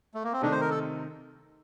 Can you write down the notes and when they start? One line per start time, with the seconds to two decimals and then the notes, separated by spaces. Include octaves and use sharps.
0.14 A3
0.24 A#3
0.33 C4
0.41 C3 D#3 A3 D4 D#4
0.52 C5
0.61 A#4
0.70 A4